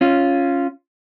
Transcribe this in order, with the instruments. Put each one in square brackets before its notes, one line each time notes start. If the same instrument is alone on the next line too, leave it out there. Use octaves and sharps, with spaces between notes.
[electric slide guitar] C#4 F4